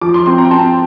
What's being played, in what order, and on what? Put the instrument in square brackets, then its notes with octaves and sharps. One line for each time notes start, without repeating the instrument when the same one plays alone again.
[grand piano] F3 [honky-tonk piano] D6
[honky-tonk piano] C6
[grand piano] C4 [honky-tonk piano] C6
[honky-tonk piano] A#5
G5
[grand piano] C4 [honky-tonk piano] A5